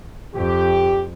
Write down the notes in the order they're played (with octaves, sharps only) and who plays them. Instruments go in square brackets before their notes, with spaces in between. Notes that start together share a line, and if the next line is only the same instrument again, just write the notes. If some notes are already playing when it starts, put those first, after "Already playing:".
[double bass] F2 [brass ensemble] G4